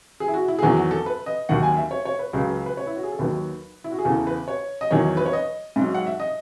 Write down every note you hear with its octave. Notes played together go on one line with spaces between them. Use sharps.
G#4
E4
F#4
E4
G#4
E2 D#3 F#3 F#4
F#4
A4
B4
D#5
D#2 D#3 F#3 F#5
G#5
E5
C#5
C#5
B4
C#2 C#3 F#3
B4
C#5
E4
F#4
G#4
A4
D#2 D#3 F#3 B4
E4
F#4
G#4
E2 C#3 E3 A4
B4
C#5
D#5
E2 D#3 F#3 C#5
B4
C#5
D#5
G#2
F#3
F#5
E5
D#5